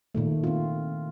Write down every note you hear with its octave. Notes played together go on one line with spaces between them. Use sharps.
A#2 D#3 A3
C4 F4